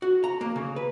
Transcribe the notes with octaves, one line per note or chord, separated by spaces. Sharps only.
F#4
A#5
A#3
C#3
B4